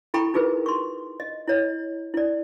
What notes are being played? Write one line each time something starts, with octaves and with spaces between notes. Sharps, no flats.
E4 A4 G5 A#5 B5 C#6
D#4 F4 G#4 A#4 B4
C6 C#6
D#5
E4 C#5 D#5
E4 D5